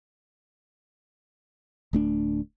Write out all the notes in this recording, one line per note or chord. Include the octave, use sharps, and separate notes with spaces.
D1 A3 D4